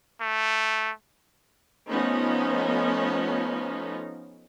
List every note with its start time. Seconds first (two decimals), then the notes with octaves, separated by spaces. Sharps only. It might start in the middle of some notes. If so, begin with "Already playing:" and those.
0.21 A3
1.89 F3 A3 B3 C#4 D#4